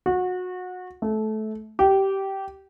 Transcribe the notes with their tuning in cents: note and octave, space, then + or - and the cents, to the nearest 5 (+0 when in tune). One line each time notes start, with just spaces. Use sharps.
F#4 -25
A3 -20
G4 -15